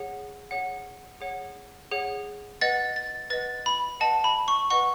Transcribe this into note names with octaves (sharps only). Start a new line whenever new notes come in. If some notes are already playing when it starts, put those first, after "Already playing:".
Already playing: G#4 C#5 F#5
G#4 C#5 F#5
G#4 C#5 F#5
G#4 C#5 F#5
B4 D#5 F#5 A6
A6
B4 D#5 F#5 A6
B5
B4 D#5 F#5 A5
B5
C#6
B4 D#5 F#5 C#6